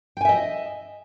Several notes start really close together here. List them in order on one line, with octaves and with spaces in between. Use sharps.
G5 G#5 E5 D#5